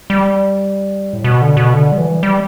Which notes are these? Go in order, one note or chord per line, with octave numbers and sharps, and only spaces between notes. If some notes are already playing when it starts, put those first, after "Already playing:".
G3
A2
B2
D3
B2
D3
G3
E3
G3